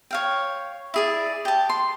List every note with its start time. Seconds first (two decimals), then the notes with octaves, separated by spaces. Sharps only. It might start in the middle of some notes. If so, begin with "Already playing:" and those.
0.11 C#5 F5 G5
0.94 E4 G#4 D5
1.45 G4 A5
1.70 C6